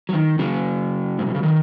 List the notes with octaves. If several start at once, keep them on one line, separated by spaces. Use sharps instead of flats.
F#3
D#3
C#3 F#3
G#2
B2
C#3
D#3